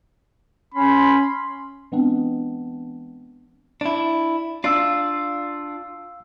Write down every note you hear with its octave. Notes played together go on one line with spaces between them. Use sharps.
C#4 B5 C6
E3 G#3 B3 C4 D4
D4 E4
D4 F4 F5 E6